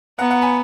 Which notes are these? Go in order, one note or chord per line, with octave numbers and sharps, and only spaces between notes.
B3 F#5 A#5
F#5 A#5
G#5 B5